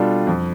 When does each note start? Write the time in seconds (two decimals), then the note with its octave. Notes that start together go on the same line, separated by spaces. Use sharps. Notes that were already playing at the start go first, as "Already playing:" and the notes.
Already playing: B2 G3 D4 F4 A4
0.27 F2